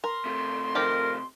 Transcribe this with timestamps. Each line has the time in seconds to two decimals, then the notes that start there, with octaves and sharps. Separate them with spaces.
0.04 A#4 C6
0.25 C3 A3
0.75 D#3 F3 G4 A#4